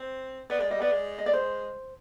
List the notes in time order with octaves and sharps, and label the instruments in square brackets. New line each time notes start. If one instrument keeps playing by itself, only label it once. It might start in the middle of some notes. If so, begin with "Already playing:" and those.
Already playing: [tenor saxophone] C4
[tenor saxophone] B3 [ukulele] D5
[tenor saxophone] G#3 [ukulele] D5
[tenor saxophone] G3 [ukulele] D#5
[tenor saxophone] B3 [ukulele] D5
[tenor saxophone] G#3
[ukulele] D#5
D5
C5